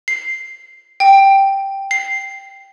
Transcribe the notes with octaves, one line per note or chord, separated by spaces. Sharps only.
C7
G5
C7